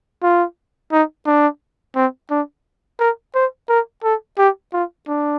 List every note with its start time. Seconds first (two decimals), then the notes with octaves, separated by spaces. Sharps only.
0.23 F4
0.92 D#4
1.26 D4
1.96 C4
2.30 D4
3.00 A#4
3.35 C5
3.69 A#4
4.04 A4
4.38 G4
4.73 F4
5.08 D4